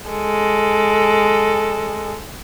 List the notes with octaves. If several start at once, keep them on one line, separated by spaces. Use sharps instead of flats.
G#3 A4